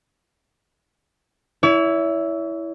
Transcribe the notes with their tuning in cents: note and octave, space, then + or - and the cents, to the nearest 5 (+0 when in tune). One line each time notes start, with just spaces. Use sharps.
E4 +0 C#5 +40